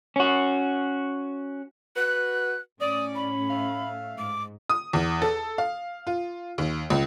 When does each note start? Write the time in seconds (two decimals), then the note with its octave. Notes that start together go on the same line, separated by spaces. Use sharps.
0.16 C#4 F#4
1.96 F#4 B4 F#6
2.81 A2 C#4 D5 D#6
3.15 B5
3.50 A3 E5 F5
4.18 G#2 D6
4.69 D#6
4.93 E2
5.22 A4
5.58 F5
6.07 F4
6.58 D#2
6.90 C#2